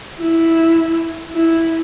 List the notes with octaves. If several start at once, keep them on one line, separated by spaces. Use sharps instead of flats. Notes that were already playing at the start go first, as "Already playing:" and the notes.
E4
E4